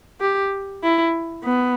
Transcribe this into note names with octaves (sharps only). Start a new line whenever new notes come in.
G4
E4
B3